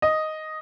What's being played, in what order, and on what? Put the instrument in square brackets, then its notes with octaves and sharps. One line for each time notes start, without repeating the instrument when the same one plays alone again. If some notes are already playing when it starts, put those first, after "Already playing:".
[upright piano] D#5